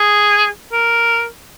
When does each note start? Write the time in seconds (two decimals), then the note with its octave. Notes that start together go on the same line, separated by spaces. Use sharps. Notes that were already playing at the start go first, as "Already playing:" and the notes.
Already playing: G#4
0.72 A#4